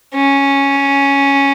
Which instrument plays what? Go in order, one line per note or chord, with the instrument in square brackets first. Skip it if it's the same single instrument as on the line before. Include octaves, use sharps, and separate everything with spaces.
[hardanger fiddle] C#4